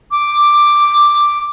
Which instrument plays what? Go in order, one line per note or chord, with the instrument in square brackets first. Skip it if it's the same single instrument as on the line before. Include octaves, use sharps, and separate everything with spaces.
[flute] D6